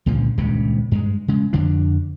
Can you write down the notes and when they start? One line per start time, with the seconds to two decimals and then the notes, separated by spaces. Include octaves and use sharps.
0.06 C#2 A#2 D3 F3
0.38 D#1 C#2 G2 C3
0.92 G2 G#3
1.28 C#3 G#3
1.53 F2 D3 F3 D4